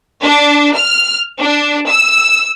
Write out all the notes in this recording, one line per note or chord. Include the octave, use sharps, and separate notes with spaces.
D4
F6
D4
E6